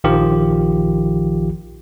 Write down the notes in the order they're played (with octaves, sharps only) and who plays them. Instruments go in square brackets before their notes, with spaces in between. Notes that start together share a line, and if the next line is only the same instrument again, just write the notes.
[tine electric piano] A#1 D#3 F3 F4 G4